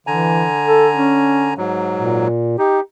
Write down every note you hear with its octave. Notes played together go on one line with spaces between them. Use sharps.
D3 E3 G#5 A#5
A4
C#4
G#2 F#3
A#2
D#4 G4